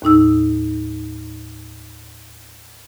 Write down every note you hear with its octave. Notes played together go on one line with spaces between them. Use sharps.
D#2 A2 D#4 E6